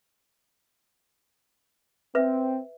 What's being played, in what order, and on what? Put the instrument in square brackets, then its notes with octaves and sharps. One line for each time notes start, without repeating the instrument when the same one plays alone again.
[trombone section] C4 [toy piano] B4 E5